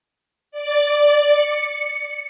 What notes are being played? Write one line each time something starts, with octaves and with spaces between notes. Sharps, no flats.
D5
C#7